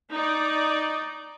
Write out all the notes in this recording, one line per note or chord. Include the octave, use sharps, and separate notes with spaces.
D#4 D5